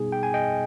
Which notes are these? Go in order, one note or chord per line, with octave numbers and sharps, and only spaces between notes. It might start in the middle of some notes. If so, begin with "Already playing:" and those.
Already playing: B2 G3 B3 D#4 G#4
G5
G#5
D#5 G5